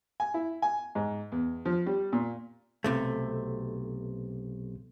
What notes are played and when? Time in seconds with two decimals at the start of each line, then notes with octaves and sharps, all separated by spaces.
0.20 G#5
0.34 E4
0.62 G#5
0.95 G#2
1.32 E2
1.65 F3
1.86 G3
2.12 A#2
2.84 B1 C3 A3